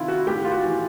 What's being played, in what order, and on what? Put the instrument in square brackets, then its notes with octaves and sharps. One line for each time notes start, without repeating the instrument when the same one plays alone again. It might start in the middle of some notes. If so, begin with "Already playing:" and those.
Already playing: [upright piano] C3 D#3 E4 F4
F#4
A2 G4
F4
F#4
E3